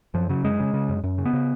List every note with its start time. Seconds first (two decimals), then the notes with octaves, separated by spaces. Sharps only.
0.14 F#2 F3
0.29 C#3 F#3
0.44 F#2 G#3
0.60 C#3
0.74 C#3
0.89 F#2
1.04 F#2
1.18 C#3
1.25 B3
1.33 C#3